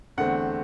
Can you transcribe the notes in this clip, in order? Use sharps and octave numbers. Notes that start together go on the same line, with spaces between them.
E2 D3 A3 C4 F#5